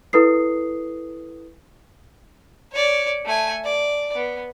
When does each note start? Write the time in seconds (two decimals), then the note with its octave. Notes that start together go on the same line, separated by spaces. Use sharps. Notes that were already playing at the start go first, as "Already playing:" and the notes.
0.13 E4 A4 B4 D#6 C7
2.72 C#5 D5
3.25 A3 G#5
3.64 D5
4.15 B3